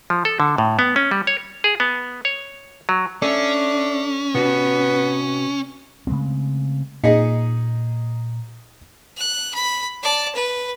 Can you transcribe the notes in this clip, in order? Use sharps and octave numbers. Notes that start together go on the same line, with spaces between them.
F3
A4
D3
A2
B3
C#4
G3
C#5
G#4
B3
C#5
F#3
C#4 D4 A4 E5
C3 B3 F#4 B4
C#3 G#3 A3 C4
A#2 D#4 G#4 D#5
F#6
B5
D5 A5
B4